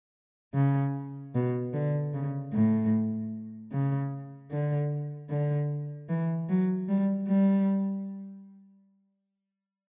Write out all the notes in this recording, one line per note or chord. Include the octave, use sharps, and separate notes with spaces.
C#3
B2
D3
C#3
A2
C#3
D3
D3
E3
F#3
G3
G3